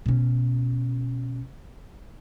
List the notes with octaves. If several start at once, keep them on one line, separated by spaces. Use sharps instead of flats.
B2 C#4